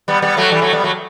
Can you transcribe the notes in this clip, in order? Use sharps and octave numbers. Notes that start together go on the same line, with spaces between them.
G3 B3
G3 B3
F#3 A3
E3 G3
F#3 A3
G3 B3
F#3 A3